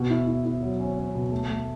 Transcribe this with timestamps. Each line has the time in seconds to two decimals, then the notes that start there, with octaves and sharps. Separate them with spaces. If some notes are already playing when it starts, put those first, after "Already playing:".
Already playing: B2
0.10 E4
0.27 E4
0.45 E4
0.62 F#3
0.79 C#4
0.97 C#4
1.15 B2
1.32 A3
1.49 A3